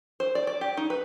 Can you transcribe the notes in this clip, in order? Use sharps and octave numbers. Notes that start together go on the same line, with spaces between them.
C5
D5
D5
G4
D#4
B4